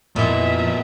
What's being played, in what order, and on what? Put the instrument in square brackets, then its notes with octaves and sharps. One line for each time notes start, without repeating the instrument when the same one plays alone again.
[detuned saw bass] F2 [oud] A#2 E3 [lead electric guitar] B3 D#5 [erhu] E5